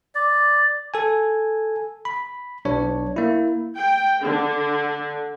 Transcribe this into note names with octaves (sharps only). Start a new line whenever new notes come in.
D5
A4 G#5
B5
B1 D4 C#5
A#3 E4
G5
D3